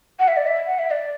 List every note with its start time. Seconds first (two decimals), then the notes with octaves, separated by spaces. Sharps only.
0.20 F#5
0.28 E5
0.37 D5
0.46 E5
0.67 F#5
0.79 E5
0.91 D5